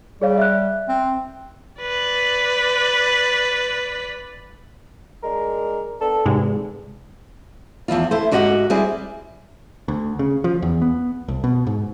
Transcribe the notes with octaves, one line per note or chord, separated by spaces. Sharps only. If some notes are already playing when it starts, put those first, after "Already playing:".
G3 G#4 C#5 F5
E5 F#6
C4
B4 D5
G#3 D4 A#4
B3 D4 A4
E2 G#2 C3 G#3
E2 F3 E4 F4
E4 A4 C5
G#2 F#4 G4 D#5 F#5
G3 C4 E4 G#4
D2
C#3
F3
E2
B3
C2
B2
G#2